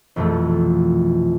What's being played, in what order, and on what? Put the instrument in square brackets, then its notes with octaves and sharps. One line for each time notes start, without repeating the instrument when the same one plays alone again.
[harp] A#1 F2 B2 E3 A3